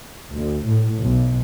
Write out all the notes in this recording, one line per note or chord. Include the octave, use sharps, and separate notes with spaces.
D2
A2
B1